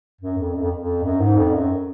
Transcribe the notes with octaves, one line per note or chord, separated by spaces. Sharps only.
F#2
F2
F#2
F2
F2
F#2
G#2
F2
F#2